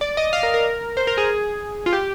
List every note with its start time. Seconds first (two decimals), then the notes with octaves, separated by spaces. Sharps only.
0.01 D5
0.17 D#5
0.33 F5
0.43 A#4
0.54 A#4
0.97 C5
1.07 A#4
1.18 G#4
1.86 F4
1.93 G4